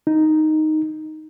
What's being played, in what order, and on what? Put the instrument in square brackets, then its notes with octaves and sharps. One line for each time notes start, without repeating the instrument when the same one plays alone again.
[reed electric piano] D#4